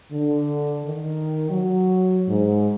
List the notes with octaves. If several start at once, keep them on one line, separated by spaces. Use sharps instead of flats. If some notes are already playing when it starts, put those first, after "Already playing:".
D3
D#3
F#3
G#2